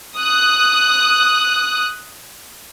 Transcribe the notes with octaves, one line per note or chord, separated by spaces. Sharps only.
D#6 F#6